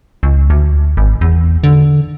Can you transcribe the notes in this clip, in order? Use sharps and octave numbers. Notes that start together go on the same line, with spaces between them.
C#2
D2
G#1
E2
D3